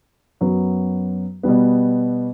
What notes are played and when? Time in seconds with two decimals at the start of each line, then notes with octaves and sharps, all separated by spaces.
0.41 F#2 F#3 B3
1.43 B2 G3 B3